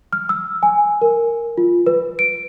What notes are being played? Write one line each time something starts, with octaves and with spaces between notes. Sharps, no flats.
F6
E6
G#5
A#4
F4
B4
D7